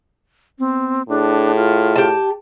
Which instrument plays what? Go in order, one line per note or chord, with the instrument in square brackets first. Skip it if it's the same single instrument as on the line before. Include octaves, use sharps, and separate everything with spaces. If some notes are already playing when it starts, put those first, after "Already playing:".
[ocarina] B3 [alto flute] C4
[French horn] A2 [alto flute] D4 [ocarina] G#4
[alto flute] F4
[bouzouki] G4 A5